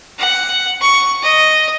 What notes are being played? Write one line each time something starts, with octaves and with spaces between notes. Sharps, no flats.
F#5
C#6
D#5